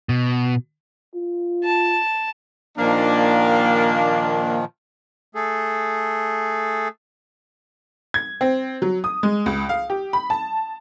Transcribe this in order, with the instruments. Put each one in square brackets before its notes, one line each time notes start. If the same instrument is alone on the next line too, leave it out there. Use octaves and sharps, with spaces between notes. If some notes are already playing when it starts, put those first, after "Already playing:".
[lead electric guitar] B2
[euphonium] F4
[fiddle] A5
[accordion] A#2 D#3 F3 [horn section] A#3 D4
[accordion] A3 G#4 A4
[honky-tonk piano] G#6
C4
F#3
D#6
G#3
C#2
F5
G4
B5
A5